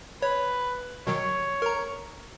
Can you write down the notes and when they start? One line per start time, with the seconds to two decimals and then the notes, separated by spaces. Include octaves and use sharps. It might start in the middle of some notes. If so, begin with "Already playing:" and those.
0.22 B4 C#5
1.07 B2 D#3 F#3 C#5
1.62 A#4 A#5